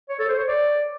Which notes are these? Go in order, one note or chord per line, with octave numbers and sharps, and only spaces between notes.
C#5
A4
C5
C#5
D5